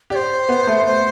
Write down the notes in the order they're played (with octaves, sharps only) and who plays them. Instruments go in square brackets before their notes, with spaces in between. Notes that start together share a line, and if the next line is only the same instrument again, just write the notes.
[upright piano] G4 [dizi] D5
[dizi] C5
[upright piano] B3
A3
[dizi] C5